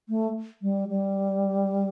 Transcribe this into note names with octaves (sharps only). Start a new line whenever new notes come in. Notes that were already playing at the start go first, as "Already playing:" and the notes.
A3
G3
G3